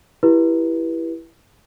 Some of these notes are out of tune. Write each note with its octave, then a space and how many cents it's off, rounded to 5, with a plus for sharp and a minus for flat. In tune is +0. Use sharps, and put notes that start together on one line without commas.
E4 +10 G4 +5 B4 -30